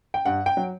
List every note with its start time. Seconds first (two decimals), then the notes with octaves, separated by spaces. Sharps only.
0.14 G5
0.25 G2 F#5
0.46 G5
0.57 F#3